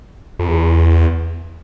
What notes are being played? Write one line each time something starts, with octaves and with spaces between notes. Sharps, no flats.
F2
E2